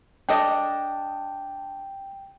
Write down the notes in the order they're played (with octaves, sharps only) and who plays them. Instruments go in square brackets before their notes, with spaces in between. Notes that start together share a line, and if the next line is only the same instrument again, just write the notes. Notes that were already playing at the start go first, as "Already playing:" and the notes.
[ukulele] D4 A4 D#5 [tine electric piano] G5